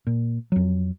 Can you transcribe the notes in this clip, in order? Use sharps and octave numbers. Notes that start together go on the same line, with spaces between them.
A#2
F2 F#3